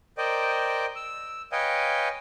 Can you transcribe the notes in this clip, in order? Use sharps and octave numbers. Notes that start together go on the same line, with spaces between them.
A#4 C5 D5 D#5 G5
E6
B4 C#5 D#5 F5 G5 G#5